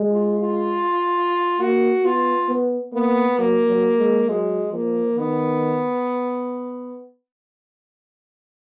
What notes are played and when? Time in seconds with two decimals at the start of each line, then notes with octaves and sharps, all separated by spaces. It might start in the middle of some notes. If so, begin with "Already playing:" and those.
Already playing: G#3
0.11 F4
0.40 F4
1.59 A#3 F#4
2.04 B3 F4
2.49 B3
2.93 A#3 B3
3.39 F#3 A#3
3.68 F#3
3.99 G#3
4.29 F#3 G#3
4.73 F3 A#3
5.18 D#3 B3